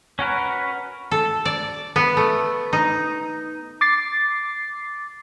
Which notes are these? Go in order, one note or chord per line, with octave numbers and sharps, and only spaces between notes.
C#4 F#4 A#4 B4
A4
D5
B3
A3
D#4
D6 A6 C7